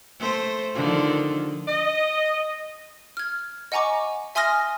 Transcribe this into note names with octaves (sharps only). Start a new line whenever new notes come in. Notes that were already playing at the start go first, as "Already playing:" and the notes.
A3 C5
D3 D#3 F3
D#5
F6 G#6
D#5 F#5 G#5 A#5 C#6 D6
E5 G#5 C6 D#6 F6 A#6